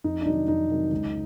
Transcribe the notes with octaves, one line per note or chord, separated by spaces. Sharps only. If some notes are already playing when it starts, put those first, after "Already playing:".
F2 D#4
D4
C3 D#3 F#3 D#4
F2 D#4
C3 D#3 F#3
C#2